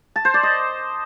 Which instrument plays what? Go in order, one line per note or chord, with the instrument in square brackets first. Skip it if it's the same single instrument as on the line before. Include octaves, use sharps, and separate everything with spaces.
[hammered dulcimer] A5
C5
D5
D#5